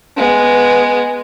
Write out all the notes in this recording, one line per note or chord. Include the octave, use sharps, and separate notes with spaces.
G#3 B3